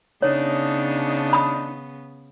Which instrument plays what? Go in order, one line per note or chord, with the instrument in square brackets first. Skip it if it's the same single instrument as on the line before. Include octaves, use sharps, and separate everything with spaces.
[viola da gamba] C#3 B3 [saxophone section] D4 D#4 [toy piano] C#5
[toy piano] B5 D#6